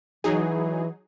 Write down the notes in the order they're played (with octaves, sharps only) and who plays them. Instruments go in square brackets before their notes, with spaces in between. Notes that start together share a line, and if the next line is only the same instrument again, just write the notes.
[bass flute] E3 [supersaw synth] F#3 D#4 G#4